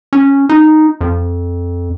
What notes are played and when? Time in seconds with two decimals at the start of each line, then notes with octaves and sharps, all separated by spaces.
0.13 C#4
0.49 D#4
1.01 F2